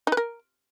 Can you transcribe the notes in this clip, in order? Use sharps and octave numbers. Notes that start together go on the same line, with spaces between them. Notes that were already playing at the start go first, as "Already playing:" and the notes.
D#4
B4
A#4